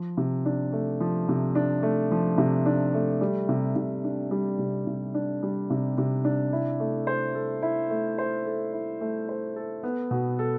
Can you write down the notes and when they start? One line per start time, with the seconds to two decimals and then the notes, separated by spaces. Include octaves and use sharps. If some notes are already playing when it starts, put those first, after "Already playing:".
Already playing: F3
0.17 C3
0.45 D4
0.73 A3
1.00 F3
1.29 C3
1.55 D4
1.83 A3
2.11 F3
2.38 C3
2.66 D4
2.94 A3
3.21 G3
3.49 C3
3.76 C3
4.04 D4
4.31 G3
4.59 C3
4.87 C3
5.14 D4
5.43 G3
5.70 C3
5.98 C3
6.24 D4
6.53 E4
6.80 A3
7.07 C5
7.35 A4
7.62 E4
7.90 A3
8.18 C5
8.46 A4
8.73 E4
9.01 A3
9.29 C5
9.56 A4
9.83 B3
10.11 B2
10.39 A4